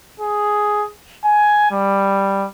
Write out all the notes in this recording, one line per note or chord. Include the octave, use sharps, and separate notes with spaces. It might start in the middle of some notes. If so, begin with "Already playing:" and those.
G#4
G#5
G3